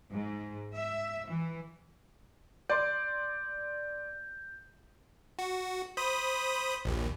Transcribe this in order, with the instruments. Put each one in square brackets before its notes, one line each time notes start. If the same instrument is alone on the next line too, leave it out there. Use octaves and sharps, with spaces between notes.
[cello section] G#2
E5
E3
[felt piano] D5 C6 [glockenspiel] G6
[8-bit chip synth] F#4
C5 B5 D#6
A#1 D#2